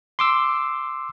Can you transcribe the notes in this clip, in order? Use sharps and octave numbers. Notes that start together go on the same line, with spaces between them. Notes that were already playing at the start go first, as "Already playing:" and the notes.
C6 D6 E6